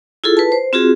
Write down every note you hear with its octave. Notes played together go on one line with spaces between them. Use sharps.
E4 F4 G#4 A4
B4 A5
C5
C4 F4 F#4 G#4